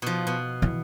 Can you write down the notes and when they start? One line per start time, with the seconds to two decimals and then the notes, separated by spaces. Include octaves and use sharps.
0.02 B2 F3
0.27 B2
0.62 E3